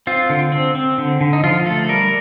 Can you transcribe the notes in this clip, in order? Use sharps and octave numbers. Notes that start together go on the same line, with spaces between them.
C4 F4
D3
C4
C4
D3
D3
D#4
F3 F4
A3 A4
G3 A#4